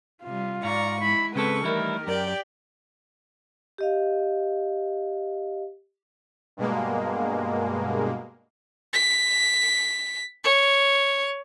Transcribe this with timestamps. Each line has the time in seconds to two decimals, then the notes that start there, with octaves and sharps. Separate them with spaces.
0.23 C3 G3 F4
0.63 G#2 D5 F5 A#5 C#6
1.02 G#3 E4 B5
1.35 C#3 G#3 C4 A4 B4 C#6
1.64 D#3 E3 G3 A3 E4 A#4
2.07 F#2 G4 D5 G5
3.78 G4 D#5 F5
6.57 G2 B2 G#3 A#3
8.93 B6
10.44 C#5